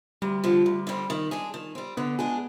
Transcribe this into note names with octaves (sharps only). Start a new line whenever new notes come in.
D2 G3
D3 F3
D2
D3 G3 C4
D#3
G#3 D4 G#4
D#3
G3 C4
D3 B3
G#3 D4 G#4